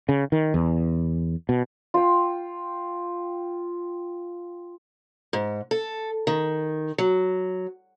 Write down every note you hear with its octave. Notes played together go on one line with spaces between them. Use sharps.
C#3
D#3
E2
B2
F4 G5
G#2
A4
D#3
F#3